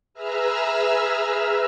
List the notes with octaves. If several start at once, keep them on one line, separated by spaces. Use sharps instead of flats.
G#4 B4 E5 A#5 E6 F6